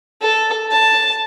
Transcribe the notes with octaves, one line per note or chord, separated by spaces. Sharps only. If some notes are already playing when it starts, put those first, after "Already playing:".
A4
A5